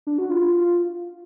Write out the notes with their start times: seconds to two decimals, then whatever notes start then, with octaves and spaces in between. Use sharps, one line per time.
0.07 D4
0.18 F#4
0.30 F4
0.42 F4